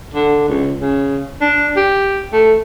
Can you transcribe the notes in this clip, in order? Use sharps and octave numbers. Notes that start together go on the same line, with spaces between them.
D3
C#2
C#3
D4
G4
A3